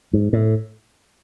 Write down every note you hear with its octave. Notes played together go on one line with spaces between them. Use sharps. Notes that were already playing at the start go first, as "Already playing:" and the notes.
G#2
A2